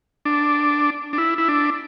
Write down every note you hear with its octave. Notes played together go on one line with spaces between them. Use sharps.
D4
D4
E4
E4
D4